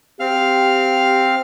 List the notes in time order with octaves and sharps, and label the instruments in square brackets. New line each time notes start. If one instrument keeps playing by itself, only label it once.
[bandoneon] C4 F5 F6 [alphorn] G4